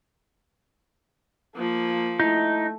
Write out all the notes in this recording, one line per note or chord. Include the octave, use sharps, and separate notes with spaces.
F3 A#3
A3 D#4 E4